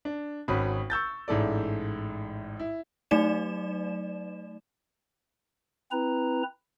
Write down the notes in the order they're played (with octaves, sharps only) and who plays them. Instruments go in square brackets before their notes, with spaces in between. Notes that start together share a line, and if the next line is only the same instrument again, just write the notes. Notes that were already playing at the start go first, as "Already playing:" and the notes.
[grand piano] D4
G#1 C#4 F#4 B5 D#6
C#6 E6 G6 A6
A1 G#2 E4 A4 D5
E4
[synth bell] F#3 A3 D#4 D5 E7
[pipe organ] C4 E4 B4 A#5